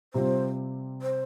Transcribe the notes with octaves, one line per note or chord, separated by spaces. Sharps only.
C3 G3 C4 F4 C5
C5